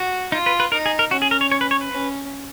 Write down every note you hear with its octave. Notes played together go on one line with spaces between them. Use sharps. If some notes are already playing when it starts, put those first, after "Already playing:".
Already playing: F#4
D#4 F4
B4
B4
D#4 A#4
G#4
A#4
C#4 F#4
G#4
A#4
C#5
C#5
B4
C#5
B4
C#4